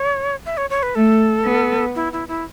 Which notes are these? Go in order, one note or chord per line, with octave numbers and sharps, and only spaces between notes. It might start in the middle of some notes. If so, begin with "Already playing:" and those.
Already playing: C#5
E5
C#5
C#5
B4
A3 A4
B3
E4
E4
E4